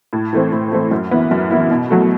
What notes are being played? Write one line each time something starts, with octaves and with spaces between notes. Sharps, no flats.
A2
E3 A3 C4
A2
E3 A3 C4
F#2
E3 B3 E4
F#2
E3 B3 E4
B2
F#3 A3